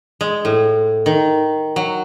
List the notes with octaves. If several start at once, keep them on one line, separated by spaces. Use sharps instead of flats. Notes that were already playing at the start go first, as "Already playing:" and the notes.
G#3
A2
D#3
F#3